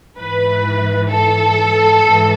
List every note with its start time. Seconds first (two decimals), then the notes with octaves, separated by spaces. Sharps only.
0.17 G#2 E3 B4
1.09 A4
2.02 G#2 E3